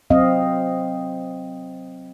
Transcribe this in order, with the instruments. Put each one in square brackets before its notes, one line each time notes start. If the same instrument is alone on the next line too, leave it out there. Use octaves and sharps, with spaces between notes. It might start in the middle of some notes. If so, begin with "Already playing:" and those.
[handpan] F#3 C4 D#5 F5